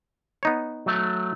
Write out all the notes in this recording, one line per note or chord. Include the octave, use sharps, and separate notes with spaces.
B3 D#4 C#5
F#3 A3